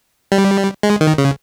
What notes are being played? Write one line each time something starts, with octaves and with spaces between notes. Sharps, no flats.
G3
G#3
D#3
C#3